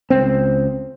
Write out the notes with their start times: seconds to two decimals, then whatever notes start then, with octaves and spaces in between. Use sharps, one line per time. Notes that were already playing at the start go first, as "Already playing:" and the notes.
0.10 C#2 C4